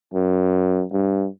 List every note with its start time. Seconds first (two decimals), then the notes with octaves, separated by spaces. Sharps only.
0.14 F#2
0.92 G2